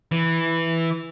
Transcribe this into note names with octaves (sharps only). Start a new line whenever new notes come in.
E3